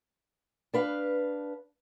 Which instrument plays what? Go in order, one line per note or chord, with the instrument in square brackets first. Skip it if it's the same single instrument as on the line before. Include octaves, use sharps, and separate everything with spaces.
[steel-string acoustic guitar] D4 B4 F5